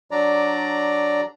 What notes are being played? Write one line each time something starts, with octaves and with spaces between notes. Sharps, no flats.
F#3 D4 D5 A#5